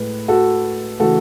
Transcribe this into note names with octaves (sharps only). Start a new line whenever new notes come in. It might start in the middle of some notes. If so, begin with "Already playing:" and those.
Already playing: A2 G#3 B4
F#4 A4
C#3 E3 A3 F#4 A4